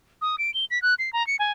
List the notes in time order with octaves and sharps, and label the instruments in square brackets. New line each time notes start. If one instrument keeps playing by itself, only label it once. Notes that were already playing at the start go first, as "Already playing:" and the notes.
[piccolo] D#6
D7
G7
B6
F#6
C7
A#5
C#7
G#5